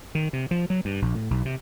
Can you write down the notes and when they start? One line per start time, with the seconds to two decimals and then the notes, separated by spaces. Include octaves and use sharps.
0.15 D#3
0.33 C3
0.51 F3
0.70 F#3
0.85 G2
1.02 A#1
1.15 A2
1.30 B1
1.45 C3